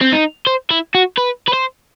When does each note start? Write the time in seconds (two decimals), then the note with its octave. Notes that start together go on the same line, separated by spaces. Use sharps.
0.01 C4
0.12 D#4
0.47 C5
0.71 E4
0.95 F#4
1.17 B4
1.48 B4
1.53 C5